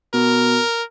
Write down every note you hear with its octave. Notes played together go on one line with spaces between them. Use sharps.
B2 A#4